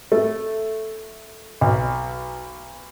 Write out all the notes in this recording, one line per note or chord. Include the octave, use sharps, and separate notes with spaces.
A3
B1